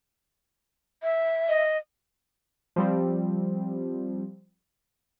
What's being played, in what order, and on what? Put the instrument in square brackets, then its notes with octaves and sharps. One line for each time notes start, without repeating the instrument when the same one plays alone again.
[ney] E5
[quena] D#5
[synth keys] F3 G3 C4